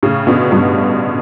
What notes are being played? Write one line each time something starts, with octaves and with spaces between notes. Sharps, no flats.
A2 C#3
B2 D3
G2 B2